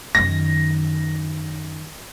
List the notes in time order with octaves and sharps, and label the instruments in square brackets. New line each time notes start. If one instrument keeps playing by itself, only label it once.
[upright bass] F#2 D#3 [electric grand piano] A#6